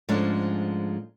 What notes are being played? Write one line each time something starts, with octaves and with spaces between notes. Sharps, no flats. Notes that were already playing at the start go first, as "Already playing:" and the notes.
G#2 F3 G#3 A3 C#4 D4